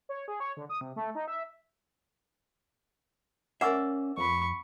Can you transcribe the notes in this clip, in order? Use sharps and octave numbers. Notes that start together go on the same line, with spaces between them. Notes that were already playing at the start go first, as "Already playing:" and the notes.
C#5
G#4
C#5
D3
D#6
C3
A3
D#4
E5
C#4 A#4 D5 E5 F#5 D6 E6
F2 B5 C#6